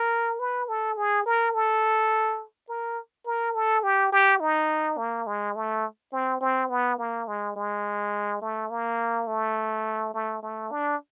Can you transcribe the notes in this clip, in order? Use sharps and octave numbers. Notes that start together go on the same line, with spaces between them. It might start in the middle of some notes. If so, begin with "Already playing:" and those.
Already playing: A#4
B4
A4
G#4
A#4
A4
A#4
A#4
A4
G4
G4
D#4
A#3
G#3
A3
C4
C4
B3
A#3
G#3
G#3
A3
A#3
A3
A3
A3
D4